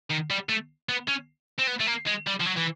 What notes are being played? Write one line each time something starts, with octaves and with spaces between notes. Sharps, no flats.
D#3
G3
A3
B3
C#4
C4
B3
A3
A#3
G#3
G3
F3
F#3
E3